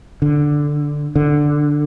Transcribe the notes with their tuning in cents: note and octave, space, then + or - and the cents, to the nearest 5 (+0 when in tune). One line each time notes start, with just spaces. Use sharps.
D3 +0
D3 +5